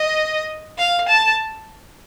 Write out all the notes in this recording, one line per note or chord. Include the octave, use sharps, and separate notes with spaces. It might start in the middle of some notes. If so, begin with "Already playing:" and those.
Already playing: D#5
F5
A5